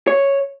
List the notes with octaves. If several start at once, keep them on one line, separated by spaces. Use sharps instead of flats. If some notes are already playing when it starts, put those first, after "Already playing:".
C#5